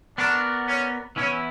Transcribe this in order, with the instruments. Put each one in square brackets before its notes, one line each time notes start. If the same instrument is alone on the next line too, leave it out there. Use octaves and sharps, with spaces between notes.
[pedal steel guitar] B3 F#4 A#4 D5 [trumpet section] D4
[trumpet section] C#4
[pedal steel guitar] E3 B3 E4 [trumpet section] C#4